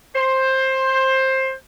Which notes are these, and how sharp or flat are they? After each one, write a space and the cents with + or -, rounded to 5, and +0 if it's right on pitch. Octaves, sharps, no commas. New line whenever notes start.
C5 +15